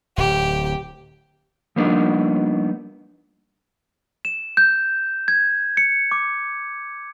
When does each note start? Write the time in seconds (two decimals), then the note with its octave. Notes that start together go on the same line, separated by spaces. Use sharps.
0.18 D1 G4
1.76 F3 G3 A#3 B3 D4 D#4
4.25 E7
4.57 G6
5.28 G#6
5.77 C#7
6.12 D6